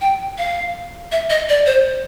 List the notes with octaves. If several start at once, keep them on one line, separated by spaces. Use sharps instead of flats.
G5
F5
E5
D#5
D5
C5